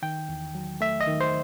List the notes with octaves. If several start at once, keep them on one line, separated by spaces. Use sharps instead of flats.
D#3 G5
E2
F#3
A3 E5
D#5
D#3
C5